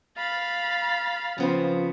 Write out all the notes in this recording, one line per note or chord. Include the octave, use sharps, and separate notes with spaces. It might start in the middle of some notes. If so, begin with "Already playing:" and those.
F5 B5 A6
C#3 F3 B3 C4